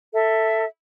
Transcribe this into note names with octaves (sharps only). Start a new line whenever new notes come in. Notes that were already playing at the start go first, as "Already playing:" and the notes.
A4 E5